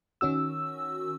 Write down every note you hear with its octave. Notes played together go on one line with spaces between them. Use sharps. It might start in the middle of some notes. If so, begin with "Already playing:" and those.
D#3 C#4 F#4 E6